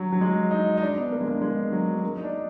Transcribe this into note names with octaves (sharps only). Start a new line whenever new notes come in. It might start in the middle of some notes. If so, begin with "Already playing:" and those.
Already playing: F#3
F#3
G#3
D#4
D#4
D4
B3
A#3
G#3
A#3
G#3
F#3
A#3
G#3
D#4
D4